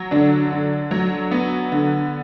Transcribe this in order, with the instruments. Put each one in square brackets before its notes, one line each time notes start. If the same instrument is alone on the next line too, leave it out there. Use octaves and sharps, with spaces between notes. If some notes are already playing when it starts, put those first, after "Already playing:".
Already playing: [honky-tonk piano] F#3
D3 D4
D3
F#3
B3
D3